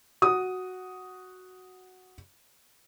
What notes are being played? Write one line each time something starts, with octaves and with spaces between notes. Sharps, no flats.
F#4 D#6